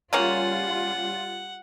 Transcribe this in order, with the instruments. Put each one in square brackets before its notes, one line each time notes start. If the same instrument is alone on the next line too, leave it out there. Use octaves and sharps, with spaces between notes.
[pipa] C#3 A#3 C#4 [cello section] G3 F4 [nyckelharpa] F#5